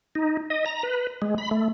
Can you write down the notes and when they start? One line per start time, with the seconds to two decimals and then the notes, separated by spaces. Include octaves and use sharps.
0.15 D#4
0.50 D#5
0.66 A#5
0.83 B4
1.22 G#3
1.38 B5
1.51 A3